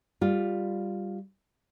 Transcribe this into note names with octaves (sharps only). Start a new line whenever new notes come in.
G3 F4